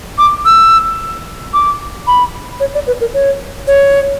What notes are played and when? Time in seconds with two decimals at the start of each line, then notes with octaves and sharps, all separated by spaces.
0.18 D6
0.45 E6
1.53 D6
2.07 B5
2.60 C#5
2.74 D5
2.87 B4
3.00 A#4
3.14 C#5
3.67 C#5